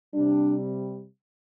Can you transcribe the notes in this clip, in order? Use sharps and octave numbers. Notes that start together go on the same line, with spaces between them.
C3 G3 D4